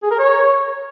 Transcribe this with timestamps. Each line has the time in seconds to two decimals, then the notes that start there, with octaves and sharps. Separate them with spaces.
0.03 G#4
0.11 A#4
0.19 C#5